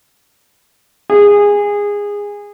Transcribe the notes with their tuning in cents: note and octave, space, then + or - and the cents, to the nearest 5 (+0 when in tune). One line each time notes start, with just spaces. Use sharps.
G#4 -20